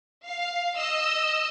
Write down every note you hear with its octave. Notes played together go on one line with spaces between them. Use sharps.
F5
D#5 E6